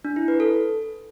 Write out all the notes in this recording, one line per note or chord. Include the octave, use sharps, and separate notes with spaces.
D4
E4
B4
A4